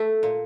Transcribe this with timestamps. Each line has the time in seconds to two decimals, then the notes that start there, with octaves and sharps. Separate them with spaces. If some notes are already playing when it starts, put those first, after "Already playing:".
Already playing: A3
0.23 A#2